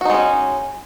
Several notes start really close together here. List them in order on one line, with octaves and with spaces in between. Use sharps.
F#4 D#4 G#3 C#4